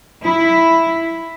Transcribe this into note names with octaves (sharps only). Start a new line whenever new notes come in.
E4